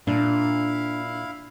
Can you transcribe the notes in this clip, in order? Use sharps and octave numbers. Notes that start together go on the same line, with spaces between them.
A#2 D4 E4 F5